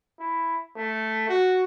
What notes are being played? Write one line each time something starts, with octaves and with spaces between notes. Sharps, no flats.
E4
A3
F#4